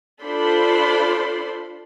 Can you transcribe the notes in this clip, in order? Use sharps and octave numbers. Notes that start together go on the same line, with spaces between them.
D4 F4 A4 C5 B5 C6